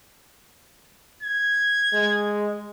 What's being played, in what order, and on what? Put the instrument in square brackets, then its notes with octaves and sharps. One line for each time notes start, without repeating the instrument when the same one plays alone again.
[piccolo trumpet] G#6
[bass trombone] G#3